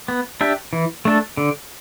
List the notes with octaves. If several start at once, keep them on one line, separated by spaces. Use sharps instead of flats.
B3
D4 G4 E5
E3
A3 D4 A4
D3